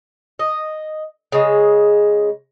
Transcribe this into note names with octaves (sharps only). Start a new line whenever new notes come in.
D#5
C#3 G#3